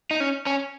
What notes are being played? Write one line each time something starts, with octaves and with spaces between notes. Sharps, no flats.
D#4
C#4
C#4